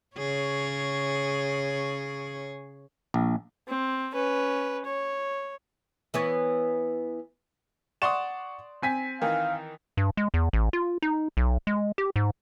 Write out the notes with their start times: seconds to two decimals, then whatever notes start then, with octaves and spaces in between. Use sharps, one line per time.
0.17 C#3 G#4 C#5
3.14 A#1
3.68 C4
4.14 C#4 B4
4.85 C#5
6.14 E3 B3 C#5
8.02 D5 F#5 C6 C#6 D#6 E7
8.82 C4 G#5 B6
9.22 D#3 E3 F5
9.97 G2
10.17 G#3
10.34 E2
10.53 A1
10.73 F4
11.02 D#4
11.37 B1
11.67 G#3
11.98 G4
12.16 G#2